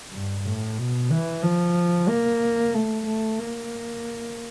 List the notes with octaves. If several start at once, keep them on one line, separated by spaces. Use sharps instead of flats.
G2
A2
B2
E3
F3
A#3
A3
A3
A#3